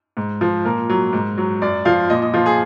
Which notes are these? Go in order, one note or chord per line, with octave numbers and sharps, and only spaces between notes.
G#2
F3
A#2 A#4
F#3
G#2
F#3
F#2 D5
F3 F5
A#2 D#5
D#5
F3 F4
G#4